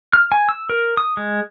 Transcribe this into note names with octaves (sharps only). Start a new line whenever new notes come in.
F6
G#5
E6
A#4
D#6
G#3